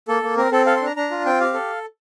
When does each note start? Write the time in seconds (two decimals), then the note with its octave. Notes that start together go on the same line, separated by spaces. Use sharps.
0.08 A#3 A4
0.23 A#3
0.37 C4 A#4
0.51 C4 A4
0.66 A4 F5
0.76 C6
0.81 D4 A#5
0.96 D4 A#5
1.11 F4
1.26 C4 G5
1.40 G4 F5
1.54 A4